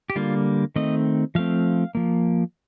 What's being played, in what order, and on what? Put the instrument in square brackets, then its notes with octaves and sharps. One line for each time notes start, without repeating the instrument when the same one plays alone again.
[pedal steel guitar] G4
D3 G3 A#3 F4
D#3 A3 C4 D#5
F3 A3 C4 F5
F3 A#3